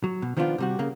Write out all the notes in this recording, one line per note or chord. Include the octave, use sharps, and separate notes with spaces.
F#3
B2
D#3 F3 B3 D4 F4
C3 G3 F#4
C#3 A#3